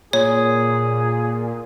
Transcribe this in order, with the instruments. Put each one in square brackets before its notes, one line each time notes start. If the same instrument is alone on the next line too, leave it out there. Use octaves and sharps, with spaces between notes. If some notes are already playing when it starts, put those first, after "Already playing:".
[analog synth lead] A#2 [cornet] G#4 [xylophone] C#5